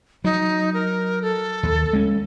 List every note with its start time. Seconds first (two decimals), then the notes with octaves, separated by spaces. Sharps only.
0.24 F#3 D#4
0.74 A#4
1.22 A4
1.63 D#2
1.93 G#3 C#4